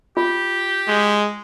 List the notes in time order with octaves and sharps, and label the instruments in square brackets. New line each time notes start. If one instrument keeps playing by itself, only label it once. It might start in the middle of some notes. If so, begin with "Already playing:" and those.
[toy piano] F4 [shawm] G4
[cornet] G#3